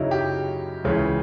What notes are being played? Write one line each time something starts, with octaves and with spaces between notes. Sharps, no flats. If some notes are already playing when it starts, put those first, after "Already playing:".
Already playing: F#2 C#3 F#3 D#4 E4
G4
C#2 C#3 E3